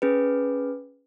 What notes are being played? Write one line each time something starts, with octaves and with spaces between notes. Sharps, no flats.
C#4 G#4 B4